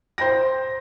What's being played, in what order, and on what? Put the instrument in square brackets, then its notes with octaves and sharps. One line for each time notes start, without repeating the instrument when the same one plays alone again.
[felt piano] C5 G5 A#6